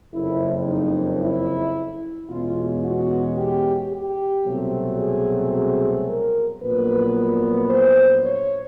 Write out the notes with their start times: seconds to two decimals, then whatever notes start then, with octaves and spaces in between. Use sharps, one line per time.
0.13 F#1 F2 C#3 E4
0.68 D#4
1.21 E4
2.29 E2 B2 G#3 C#4 F4
2.84 F#4
3.37 G4
3.92 G4
4.45 C2 B2 F#3 A3 C4
4.99 G#4
5.53 G#4
6.07 A#4
6.61 A#1 A#2 F#3 B3 B4
7.69 C5
8.23 C#5